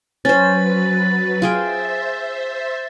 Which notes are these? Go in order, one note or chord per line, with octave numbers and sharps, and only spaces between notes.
F#3 C#4 B4 C5 A6
F4 G#4 C5 E5 G5